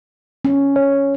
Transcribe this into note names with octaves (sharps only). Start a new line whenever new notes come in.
C#4
C#5